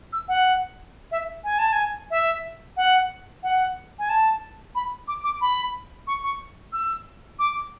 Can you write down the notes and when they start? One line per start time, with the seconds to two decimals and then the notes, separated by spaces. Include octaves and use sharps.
0.13 E6
0.28 F#5
1.12 E5
1.44 G#5
1.59 A5
1.72 G#5
2.11 E5
2.77 F#5
3.43 F#5
3.99 G#5
4.09 A5
4.75 B5
5.08 D6
5.24 D6
5.41 B5
6.07 C#6
6.24 C#6
6.73 E6
7.39 D6